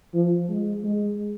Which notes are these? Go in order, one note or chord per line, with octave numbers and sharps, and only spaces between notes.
F3
G#3
G#3